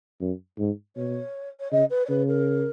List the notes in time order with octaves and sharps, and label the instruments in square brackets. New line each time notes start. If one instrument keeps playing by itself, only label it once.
[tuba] F#2
G#2
[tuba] B2 [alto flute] C#5
[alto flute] C#5
[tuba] C#3 [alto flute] D#5
[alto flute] B4
C#5
[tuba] C#3 [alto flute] B4
[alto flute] A#4